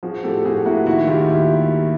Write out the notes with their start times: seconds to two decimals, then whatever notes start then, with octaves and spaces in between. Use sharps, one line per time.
0.03 F3 F#4 G#4
0.24 A2 G4 A4
0.45 A2 F#4 G#4
0.65 A#3 E4 F#4
0.86 D#3 E4 F#4
1.07 D#2 F4 G4
1.28 E4